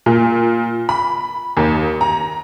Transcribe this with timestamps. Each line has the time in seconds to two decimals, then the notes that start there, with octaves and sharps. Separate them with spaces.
0.06 A#2
0.89 B5
1.57 D#2
2.01 A#5